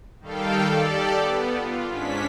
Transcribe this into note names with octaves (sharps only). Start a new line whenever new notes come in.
D#3 G3 A4 F5 G5
G4 A4 D5
B3
F4
G#2 C#4 D4 B6